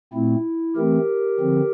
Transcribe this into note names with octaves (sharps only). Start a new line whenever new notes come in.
A#2 A3 C4 E4
E3 A3 C4 G4 A#4
D3 F3 C4